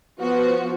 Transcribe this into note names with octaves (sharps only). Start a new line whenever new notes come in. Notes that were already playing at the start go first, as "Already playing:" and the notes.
F3 B3 F#4